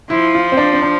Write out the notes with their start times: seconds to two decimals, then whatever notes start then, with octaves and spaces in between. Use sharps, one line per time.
0.10 F3 E4
0.35 F4
0.52 C4
0.57 D4
0.73 C4
0.82 D4